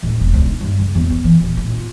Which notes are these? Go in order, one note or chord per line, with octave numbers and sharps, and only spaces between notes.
D1
E1
C#2
D#4
G2
C#3
E2
A#3
E3
D#1
A2
F4